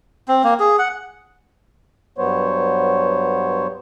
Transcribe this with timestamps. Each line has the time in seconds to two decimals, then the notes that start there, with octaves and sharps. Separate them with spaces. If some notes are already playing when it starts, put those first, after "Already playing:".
0.28 C4
0.44 A#3
0.60 G#4
0.79 F#5
2.18 G2 F#3 B3 C5 C#5